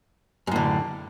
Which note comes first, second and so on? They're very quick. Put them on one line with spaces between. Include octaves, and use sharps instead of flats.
F#2 A2 D3